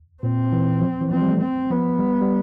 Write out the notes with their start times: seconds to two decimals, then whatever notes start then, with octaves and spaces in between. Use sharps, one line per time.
0.23 A#2 C4
0.53 E3
0.81 F3
1.01 E3
1.11 F3 C4
1.22 G3
1.31 A3
1.41 C4
1.70 F3 B3
1.99 G3
2.22 G3